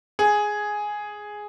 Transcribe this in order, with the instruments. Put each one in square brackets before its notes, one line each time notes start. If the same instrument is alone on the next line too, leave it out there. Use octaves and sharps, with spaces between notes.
[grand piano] G#4